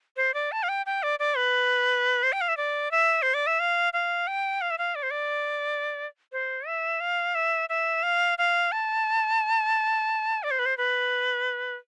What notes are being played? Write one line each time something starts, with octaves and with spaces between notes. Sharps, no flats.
C5
D5
A5
F5
G5
G5
D5
D5
B4
C5
G5
F5
E5
D5
E5
C5
D5
E5
F5
F5
G5
F5
E5
F5
D5
C5
D5
C5
E5
F5
E5
E5
F5
F5
A5
D5
C5
B4
C5
B4